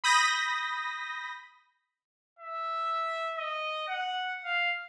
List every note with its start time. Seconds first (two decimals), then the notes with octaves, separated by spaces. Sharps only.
0.04 B5 D#6 G6 A#6 B6
2.39 E5
3.38 D#5
3.88 F#5
4.44 F5